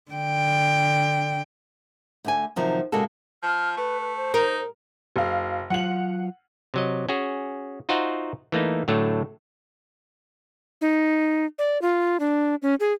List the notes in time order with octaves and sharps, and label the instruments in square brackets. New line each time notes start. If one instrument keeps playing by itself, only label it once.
[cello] D3 G5
[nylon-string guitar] D2 D3 G#5
C3 D#3 F3 F#3
A#2 C#3 G#3 A#3 F#4 A4
[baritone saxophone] F3 [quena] F6
[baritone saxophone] A3 [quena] B4
[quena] B4
C5
[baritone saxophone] D#4 [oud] A#4
[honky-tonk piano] F#1 F5
[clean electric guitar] F#3 F4 F5 [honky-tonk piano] F#5 F#7
[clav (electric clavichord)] C3 F#3 D#5
C#4 F#4 G#4
D#4 F4 F#4 C5 E5 F#5
E3 A3 A#3 D#4
A2 D3 F#3 A3 A4
[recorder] D#4
D5
F4
D4
C#4
G#4